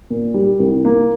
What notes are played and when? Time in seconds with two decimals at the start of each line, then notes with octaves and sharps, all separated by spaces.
0.10 A#2
0.34 G3
0.60 C2
0.85 A#3